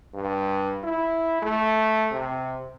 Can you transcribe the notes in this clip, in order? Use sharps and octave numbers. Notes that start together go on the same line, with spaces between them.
G2
E4
A3
C3